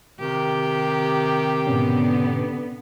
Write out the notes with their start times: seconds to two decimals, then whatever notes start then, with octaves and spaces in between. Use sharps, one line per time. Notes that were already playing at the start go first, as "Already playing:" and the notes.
0.20 C3 D#3 G4
1.67 G#2 B2 D3 B3 C#4